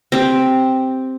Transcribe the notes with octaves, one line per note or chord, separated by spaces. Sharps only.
C4 G4